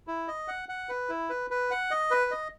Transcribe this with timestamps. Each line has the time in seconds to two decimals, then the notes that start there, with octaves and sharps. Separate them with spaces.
0.07 E4
0.28 D#5
0.48 F#5
0.69 F#5
0.89 B4
1.09 E4
1.30 B4
1.51 B4
1.71 F#5
1.91 D#5
2.11 B4
2.31 D#5